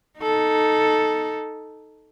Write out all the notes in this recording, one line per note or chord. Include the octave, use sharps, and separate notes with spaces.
D#4 A4